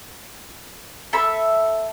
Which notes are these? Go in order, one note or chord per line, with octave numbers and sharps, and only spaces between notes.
A4 E5 B5